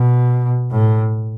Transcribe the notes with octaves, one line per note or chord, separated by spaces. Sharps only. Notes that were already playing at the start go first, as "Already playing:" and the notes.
Already playing: B2
A2